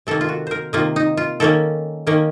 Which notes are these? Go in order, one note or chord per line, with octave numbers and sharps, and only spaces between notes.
C3 D#3 A#3 A4
F4
F#4
A#4 C5
C3 D#3 A#3 F4
D#4
F4
D#3 A#3 C#4 A4
D#3 A#3 C#4